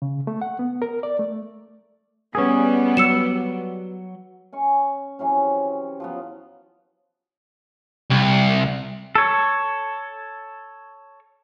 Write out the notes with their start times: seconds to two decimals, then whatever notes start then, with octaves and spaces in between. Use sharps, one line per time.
0.02 C#3
0.27 A3
0.42 F#5
0.59 B3
0.82 A#4
1.03 D5
1.19 A3
2.35 G3 B3 C#4 G#4
2.97 F#3 E6 C#7 E7
4.52 C#4 G#5 C#6
5.19 C3 E3 F#3 C#4
6.00 F3 F#3 B3
8.10 C2
9.15 A4 C#5